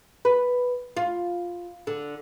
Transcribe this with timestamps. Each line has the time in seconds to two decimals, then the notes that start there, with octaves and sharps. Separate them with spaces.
0.25 B4
0.97 F4
1.87 D3